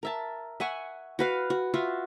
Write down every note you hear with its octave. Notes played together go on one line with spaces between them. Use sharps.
A#4 E5 A5
E5 F#5 G#5 C#6
F#4 B4 F5
F#4
F4 F#4 E5